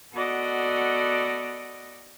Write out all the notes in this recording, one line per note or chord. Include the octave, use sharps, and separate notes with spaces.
B3 F#4 A4 D5 D#5 F#5